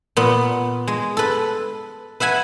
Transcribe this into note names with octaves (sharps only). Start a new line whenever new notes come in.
A#2 B3
G#3
A4 B4
B4 E5 F#5 G#5